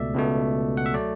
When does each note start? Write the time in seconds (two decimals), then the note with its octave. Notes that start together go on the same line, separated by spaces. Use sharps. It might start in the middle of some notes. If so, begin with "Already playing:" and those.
Already playing: C#2 B2 A3 D5 E5
0.14 C#2 B2 A3
0.77 F#5
0.86 E5
0.94 F#3 A3 D5